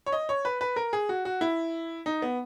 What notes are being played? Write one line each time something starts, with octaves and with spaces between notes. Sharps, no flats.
C#5
D#5
C#5
B4
B4
A#4
G#4
F#4
F#4
E4
D#4
B3